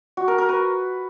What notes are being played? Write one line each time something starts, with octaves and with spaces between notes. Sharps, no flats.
F#4
A#4
A#4
B4